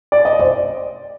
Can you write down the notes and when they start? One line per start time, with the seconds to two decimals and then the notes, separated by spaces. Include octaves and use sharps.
0.12 D5
0.25 D#5
0.39 C5 D5